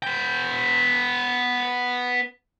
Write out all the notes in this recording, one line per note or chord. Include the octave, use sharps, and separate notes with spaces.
B3 G5